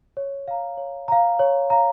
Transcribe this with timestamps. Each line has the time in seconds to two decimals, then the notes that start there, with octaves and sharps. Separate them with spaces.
0.17 C#5
0.48 F5 A#5
0.77 C#5
1.08 F5 A#5
1.39 C#5
1.70 F5 A#5